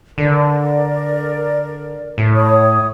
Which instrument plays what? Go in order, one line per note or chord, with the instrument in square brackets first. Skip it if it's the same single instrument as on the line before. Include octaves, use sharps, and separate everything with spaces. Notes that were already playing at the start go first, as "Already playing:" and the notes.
[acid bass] D3 [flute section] A#4 D5
[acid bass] A2
[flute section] C#5 D#6